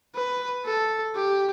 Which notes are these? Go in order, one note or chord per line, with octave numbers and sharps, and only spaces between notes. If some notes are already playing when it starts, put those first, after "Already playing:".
B4
A4
G4